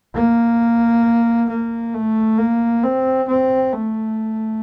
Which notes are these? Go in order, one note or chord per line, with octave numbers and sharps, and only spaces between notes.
A#3
A#3
A3
A#3
C4
C4
A3